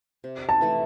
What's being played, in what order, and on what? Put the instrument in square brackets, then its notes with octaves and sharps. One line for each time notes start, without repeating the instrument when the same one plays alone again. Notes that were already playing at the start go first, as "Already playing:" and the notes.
[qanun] C3
[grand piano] A5
[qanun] E3 A3 E4